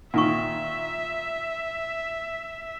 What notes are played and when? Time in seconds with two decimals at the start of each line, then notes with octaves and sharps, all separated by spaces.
0.14 A#2 D#3 E5 F#5 C#6